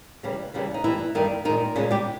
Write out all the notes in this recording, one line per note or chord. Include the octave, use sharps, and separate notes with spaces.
D#2 C#3 E3 G3
D#2 C#3 E3 G3
D#4
G2 E3 G3 E4
G2 D#3 G3 D#4
A#2 D#3 G#3 D#4
A#2 C#3 G#3 C#4
G3 G4